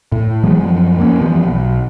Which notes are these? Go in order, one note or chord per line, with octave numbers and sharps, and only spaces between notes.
A2
E3 F#3 G#3 B3
F#2 F3
F2 A#3 B3 C#4
E3 F3 G3 B3
B1